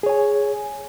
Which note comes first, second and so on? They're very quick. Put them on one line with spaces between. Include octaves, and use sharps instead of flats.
G#4 C#5 G#5